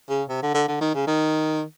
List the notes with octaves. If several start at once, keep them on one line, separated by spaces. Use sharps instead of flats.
C#3
C3
D3
D3
D3
D#3
C#3
D#3